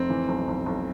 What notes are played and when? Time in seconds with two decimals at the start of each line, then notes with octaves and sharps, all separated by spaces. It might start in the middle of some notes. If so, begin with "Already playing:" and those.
Already playing: F1 C4
0.10 E3
0.29 B1
0.48 B1
0.66 B1